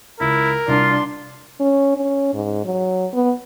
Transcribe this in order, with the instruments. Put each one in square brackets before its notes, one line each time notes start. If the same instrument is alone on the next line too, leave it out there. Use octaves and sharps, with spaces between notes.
[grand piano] C#2 [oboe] E4 [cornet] A#4
[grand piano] C2 [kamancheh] D4 C6 [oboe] F4
[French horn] C#4
C#4
G#2
F#3
B3